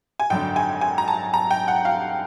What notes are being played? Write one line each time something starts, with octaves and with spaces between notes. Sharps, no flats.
G#5
G#1 F#2 D3 G5
G#5
G#5
A#5
A5
A#5
G5
F#5
F5